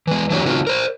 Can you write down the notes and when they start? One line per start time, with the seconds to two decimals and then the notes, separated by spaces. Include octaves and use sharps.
0.07 E3 G#3
0.30 E3 F#3 A#3 D4 G4 C#5
0.45 C#3 A3 C4 D#4 F4 F#4
0.67 A#4 C5